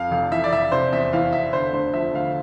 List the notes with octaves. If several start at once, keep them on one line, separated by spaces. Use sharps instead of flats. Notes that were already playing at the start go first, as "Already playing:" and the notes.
Already playing: F2 F5
F1 F5
E3 E5
D5
F1 E5
C3 C5
E2 E5
E3 F5
E2 E5
D3 C5
D2 C5
F3 E5
D2 F5